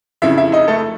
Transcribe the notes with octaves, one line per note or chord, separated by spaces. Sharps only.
F2 C#3 F3 E4 E5
E4 E5
D#4 D#5
A3 A4